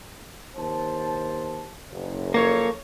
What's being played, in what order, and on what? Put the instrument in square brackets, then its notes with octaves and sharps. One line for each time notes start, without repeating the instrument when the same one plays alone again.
[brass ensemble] D#2 C5 A5
F#1
[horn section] F3 A4 C#5 [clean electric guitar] A#3